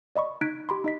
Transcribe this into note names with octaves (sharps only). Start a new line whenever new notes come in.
D5 D#5 B5 C#6
D#4 F#6 G#6 B6 D7
G4 B5 C6
D#4 D#5 B6